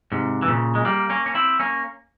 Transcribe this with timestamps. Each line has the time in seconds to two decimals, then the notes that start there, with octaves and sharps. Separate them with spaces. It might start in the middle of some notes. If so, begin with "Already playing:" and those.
0.12 G#2 C3
0.42 E3
0.48 A#2 C#3
0.75 G#3
0.85 G3 A#3
1.10 A#3 C#4
1.26 C#4
1.34 C4 E4
1.60 A#3 C#4